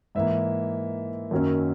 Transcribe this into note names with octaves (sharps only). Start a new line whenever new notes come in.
G#2 E3 A#3 E5
F#2 D#3 F#3 A#3 C#4